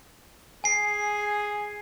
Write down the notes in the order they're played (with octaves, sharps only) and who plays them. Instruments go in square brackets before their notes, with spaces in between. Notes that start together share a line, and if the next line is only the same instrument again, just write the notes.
[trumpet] G#4 [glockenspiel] G#5 C7